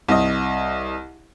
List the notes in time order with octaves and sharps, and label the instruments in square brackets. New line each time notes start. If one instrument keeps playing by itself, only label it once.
[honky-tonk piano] C2 D#5